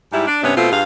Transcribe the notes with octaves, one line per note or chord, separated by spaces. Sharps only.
G#2 G3 E4
D4
G2 C3 B3 C#4
B2 A3 C4 F4
G2 F4 G#4 F5